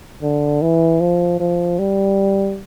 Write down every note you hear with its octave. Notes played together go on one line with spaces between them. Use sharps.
D3
E3
F3
F3
G3